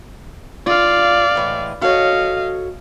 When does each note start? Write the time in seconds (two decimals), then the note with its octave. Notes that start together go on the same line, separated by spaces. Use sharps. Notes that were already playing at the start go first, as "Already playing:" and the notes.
0.66 F4 D5 F5
1.35 A2 E3 G#3
1.82 F#4 A4 C#5 D#5 F5